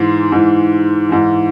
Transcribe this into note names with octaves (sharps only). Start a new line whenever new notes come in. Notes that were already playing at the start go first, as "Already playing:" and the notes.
Already playing: G#2 E3 C6
G#2 E3
G#2 E3